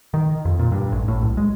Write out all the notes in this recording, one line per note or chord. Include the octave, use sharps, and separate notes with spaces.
D#3
F2
A#2
G2
A1
A2
B1
G#3